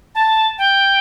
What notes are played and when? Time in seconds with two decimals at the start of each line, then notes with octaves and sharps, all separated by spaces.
0.15 A5
0.58 G5